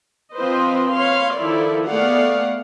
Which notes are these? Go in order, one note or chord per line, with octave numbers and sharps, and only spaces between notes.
F3 C4 F4 B4 C5 D#5
B4 C#5 F5 C6
D#3 F3 E4 A4 D5
A3 B3 G#4 D5 F5 F#5